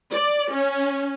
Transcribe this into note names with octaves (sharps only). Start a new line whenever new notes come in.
D5
C#4